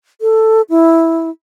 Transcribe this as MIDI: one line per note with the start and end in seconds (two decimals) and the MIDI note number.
0.21 0.61 69
0.70 1.29 64